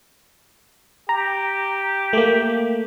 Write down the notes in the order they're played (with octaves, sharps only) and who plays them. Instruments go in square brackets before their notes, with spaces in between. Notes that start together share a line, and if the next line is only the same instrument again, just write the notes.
[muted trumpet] G4 [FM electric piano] A#5
[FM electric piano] A3 A#3